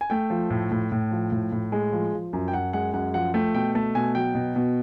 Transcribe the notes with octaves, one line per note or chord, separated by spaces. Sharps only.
G#5
A3 G5
F3
A2
A2
A2
F3
A2
A2
G#3
F3
F3
F#2
G5
F#2 F#5
G#3 F#5
F#2 F#5
F3 F#5
A3 G5
B2 G5
A3 A5
B2 G#5
F#3 G5
B2
B2